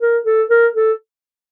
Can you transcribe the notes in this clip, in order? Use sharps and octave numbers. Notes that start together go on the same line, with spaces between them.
A#4
A4
A#4
A4